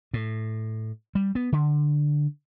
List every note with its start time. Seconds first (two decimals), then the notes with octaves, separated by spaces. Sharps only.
0.14 A2
1.15 G3
1.35 B3
1.52 D3